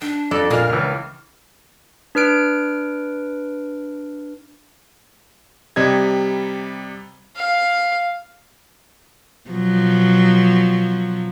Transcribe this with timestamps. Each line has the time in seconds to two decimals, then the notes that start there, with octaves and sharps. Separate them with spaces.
0.02 D4 G5
0.31 F2 G4 A4 D5
0.50 A#2 G#3 A#3 D4 A#4 F6
0.69 C#2 E3 F6
2.15 D4 B4 F6 D7
5.76 C3 G3 D#5 G#6
7.36 F5
9.49 B2 F3 F#3